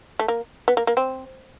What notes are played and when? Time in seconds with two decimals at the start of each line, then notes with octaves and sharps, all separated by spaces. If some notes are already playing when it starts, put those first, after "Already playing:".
0.19 A3
0.28 A#3
0.68 B3
0.77 A#3
0.87 A#3
0.97 C4